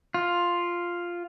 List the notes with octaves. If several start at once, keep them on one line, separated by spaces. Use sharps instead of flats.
F4